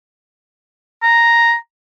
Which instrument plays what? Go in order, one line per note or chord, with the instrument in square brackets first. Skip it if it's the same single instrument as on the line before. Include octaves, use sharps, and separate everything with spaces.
[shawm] A#5